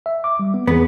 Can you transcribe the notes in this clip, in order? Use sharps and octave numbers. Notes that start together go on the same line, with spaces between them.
E5
D6
G3
B3
E2 B3 G#4